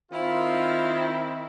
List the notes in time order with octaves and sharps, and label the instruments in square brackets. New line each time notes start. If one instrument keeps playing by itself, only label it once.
[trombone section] D#3 C4 [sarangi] E4 [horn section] F4